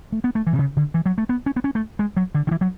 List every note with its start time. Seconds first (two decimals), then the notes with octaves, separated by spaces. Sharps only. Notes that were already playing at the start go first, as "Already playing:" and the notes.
0.12 A3
0.24 B3
0.35 A3
0.47 E3
0.53 B2
0.59 C#3
0.77 D3
0.94 E3
1.06 F#3
1.18 A3
1.29 B3
1.46 C#4
1.56 B3
1.64 C#4
1.75 A3
1.99 G#3
2.17 F#3
2.35 D3
2.47 D3
2.51 E3
2.61 F#3